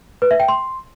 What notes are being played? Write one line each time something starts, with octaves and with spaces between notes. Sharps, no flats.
B4
E5
G5
C6